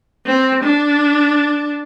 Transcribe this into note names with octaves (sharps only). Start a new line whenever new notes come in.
C4
D4